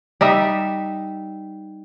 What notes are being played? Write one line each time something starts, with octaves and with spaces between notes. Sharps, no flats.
G3 D#4 E5